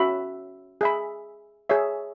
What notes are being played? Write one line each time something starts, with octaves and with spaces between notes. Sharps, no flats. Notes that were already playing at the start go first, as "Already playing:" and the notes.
Already playing: C#4 F#4 E5 B5
G#4 E5 B5
G#4 C#5 E5